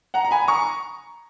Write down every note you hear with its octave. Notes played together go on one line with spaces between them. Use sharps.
F#5 A#5
A#5
G#5 B5
A#5 C#6